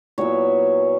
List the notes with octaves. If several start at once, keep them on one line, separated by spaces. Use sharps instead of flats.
A#2 F#3 B3 E4 C#5